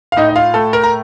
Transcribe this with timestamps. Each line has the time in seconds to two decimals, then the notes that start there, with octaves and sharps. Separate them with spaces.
0.12 F5
0.16 A2 D#4 D#5
0.29 D#5
0.36 F4 F5
0.54 A3 A4
0.73 A#4
0.83 A#5